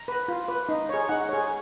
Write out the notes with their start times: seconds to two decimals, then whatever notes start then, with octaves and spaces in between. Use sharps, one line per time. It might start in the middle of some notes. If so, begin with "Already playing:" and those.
Already playing: A#5
0.08 B4
0.28 F4
0.48 B4
0.69 D#4
0.89 G#4 C#5
1.09 D#4 F#5
1.29 G#4 C#5